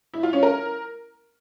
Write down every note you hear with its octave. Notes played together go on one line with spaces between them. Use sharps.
E4
F4
C#4
A#4